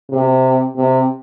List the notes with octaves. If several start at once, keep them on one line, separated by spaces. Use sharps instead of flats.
C3
C3